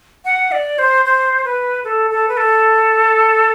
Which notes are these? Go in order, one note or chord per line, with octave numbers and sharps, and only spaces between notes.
F#5
D5
C5
C5
B4
A4
A4
B4
A4